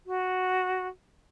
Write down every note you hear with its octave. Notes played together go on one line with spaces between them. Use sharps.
F#4